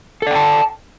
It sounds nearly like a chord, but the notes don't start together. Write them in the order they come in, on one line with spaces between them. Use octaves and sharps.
A4 D5 G5 A5